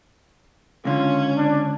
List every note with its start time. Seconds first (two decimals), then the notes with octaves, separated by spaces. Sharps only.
0.85 C#2 D3 C#4 F4
1.37 D4